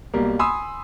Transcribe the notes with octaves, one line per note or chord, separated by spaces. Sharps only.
B1 G3 A#3
G#5 B5 C6 D#6 E6